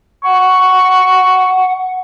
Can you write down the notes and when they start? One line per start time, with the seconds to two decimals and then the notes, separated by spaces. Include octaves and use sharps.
0.24 F#5 C#6